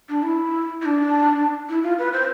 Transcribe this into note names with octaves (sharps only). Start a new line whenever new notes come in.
D4
E4
E4
D4
E4
F4
B4
C5